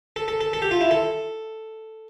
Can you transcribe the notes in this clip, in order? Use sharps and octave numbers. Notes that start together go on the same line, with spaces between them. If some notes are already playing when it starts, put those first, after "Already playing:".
A4
A4
A4
A4
G4
F4
E4
A4